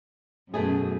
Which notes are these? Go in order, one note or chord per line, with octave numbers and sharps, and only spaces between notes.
F#2 B2 A3 G#4